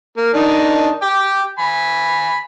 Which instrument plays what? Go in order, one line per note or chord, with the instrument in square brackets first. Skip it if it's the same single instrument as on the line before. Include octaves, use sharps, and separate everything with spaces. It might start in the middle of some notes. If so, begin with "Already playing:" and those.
[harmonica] A#3
D#3 D4 D#4
G5 D6
G#5 B5